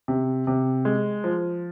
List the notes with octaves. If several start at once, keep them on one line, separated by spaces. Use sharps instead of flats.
C3
C3
G#3
F3